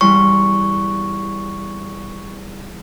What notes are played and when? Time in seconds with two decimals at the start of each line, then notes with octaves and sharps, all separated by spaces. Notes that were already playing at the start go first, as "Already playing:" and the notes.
0.01 E2 G3 C6 C#6